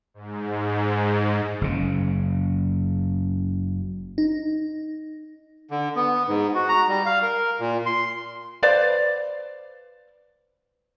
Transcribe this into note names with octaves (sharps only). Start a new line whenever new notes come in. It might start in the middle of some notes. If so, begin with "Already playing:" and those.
G#2
F#1 C#3
D#4
D3
B3
G#2
F#4
A#5
G3
F5
A#4
A#2
C6
B4 C5 D5 F5